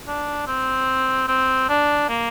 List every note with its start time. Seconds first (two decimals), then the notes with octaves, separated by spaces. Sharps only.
0.08 D4
0.47 C4
1.28 C4
1.69 D4
2.09 A#3